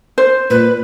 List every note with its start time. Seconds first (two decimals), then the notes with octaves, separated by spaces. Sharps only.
0.18 C5
0.50 A#2 B4